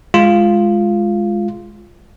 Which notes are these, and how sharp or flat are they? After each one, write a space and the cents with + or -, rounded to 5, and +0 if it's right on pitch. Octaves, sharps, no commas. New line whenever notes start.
G#3 +0 F4 -5